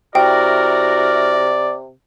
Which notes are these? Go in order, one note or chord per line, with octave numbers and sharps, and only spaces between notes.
C3 E4 F#4 A#4 D5 G5